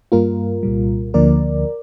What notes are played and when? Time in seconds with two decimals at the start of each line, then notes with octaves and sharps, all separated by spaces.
0.12 G2 G3 A#3 F4 A#4
0.63 C2 A#2 G3
1.14 D2 D3 F3 A#3 A#4 D5